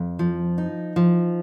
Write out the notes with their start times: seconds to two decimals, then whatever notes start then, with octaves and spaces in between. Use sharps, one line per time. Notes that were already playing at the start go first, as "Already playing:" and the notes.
Already playing: F2
0.19 F3
0.58 D#4
0.96 F3